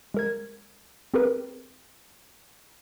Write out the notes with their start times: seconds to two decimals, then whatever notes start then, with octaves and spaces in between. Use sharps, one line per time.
0.14 G#3 A#4 G#6
1.14 C4 G4 G#4 A#4 B4